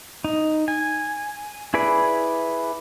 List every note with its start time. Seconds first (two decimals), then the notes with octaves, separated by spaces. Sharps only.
0.24 D#4
0.68 G#5
1.74 E4 G#4 B4 D5